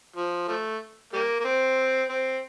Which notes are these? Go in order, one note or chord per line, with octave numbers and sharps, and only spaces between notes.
F3
F3 A3
G3 A#3
A#3
C4
C4